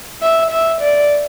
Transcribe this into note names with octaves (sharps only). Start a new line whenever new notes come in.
E5
E5
D5